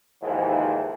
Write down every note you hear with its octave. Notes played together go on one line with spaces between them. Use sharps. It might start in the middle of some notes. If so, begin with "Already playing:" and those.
D#2 G#2 C3 E3 F3